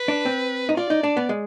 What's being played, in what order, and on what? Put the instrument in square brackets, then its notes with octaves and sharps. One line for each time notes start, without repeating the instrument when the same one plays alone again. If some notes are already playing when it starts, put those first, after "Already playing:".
Already playing: [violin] B4
[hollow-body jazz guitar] D4
C4
D#4
[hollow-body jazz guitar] F4 [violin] D5
[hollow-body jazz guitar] D#4
D4
B3
G#3